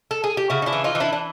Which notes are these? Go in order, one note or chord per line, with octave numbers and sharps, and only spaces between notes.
A4
G#4
G4
C#3 E4 F#4
D#4
D4 E4
E3
D#4 F4
E3
D4 E4
D4